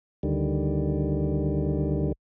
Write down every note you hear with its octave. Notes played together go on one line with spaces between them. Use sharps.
D2 D3 D#3 G3